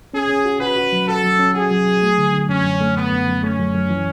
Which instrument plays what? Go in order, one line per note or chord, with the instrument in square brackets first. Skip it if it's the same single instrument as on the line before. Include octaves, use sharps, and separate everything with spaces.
[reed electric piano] C#4 [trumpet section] G#4
[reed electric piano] C#4
F#4
[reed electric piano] F#4 [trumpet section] B4
[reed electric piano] F#4
F#3
[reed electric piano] F#4 [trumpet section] A4
[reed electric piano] F#3
C#4
[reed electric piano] F#4 [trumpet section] G#4
[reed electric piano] F#3
F#3
A3
D3
D3
[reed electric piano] F#2 [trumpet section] C#4
[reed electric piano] F#2
A3
[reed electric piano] F#2 [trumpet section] B3
[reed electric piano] F#2
F#2
[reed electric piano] A3 [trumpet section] C#4
[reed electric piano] F#2
F#2
E3